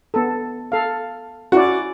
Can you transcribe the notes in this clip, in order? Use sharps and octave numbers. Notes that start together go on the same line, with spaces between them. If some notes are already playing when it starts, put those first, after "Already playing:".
B3 A4
A4 F5
C#4 E4 F#4 D5